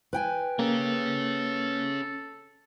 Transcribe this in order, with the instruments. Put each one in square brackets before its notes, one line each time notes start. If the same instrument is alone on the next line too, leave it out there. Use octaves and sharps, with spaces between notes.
[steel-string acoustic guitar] B4 G5 G#5
[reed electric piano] A#3 [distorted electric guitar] C#4 G#4 [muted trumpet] A4